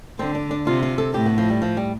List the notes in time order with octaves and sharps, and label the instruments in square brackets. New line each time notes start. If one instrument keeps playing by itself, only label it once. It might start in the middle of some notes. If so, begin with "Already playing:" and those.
[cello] D3 [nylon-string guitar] C4
[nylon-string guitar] D4
D4
[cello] C3 [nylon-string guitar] F4
[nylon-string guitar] F4
A4
[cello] A2 [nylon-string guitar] G4
[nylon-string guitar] B3
F3
G3
F3
G3